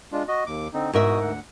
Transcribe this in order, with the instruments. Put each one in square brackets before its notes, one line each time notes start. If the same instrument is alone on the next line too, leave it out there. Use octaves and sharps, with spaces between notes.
[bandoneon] G#3 D4 F4
F#4 D#5
D#2 D6
D3 C4 D#4
[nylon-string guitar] G#2 A#4 E5 [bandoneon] B2 F#4 D#6
[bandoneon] D2 F#5